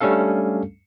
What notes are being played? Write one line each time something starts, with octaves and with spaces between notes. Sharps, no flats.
G3 A3 C#4 D4 A4 F5